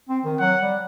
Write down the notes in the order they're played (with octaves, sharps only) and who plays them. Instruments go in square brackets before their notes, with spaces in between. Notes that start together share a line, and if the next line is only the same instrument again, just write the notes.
[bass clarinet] C4
D#3
[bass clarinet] F#3 [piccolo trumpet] F#5
[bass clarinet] G3